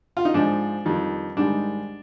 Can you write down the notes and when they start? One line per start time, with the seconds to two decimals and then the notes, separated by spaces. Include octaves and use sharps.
0.17 F4
0.25 D#4
0.34 G#2 F3 D4
0.85 F2 D#3 G3
1.37 G#2 D#3 G3 D4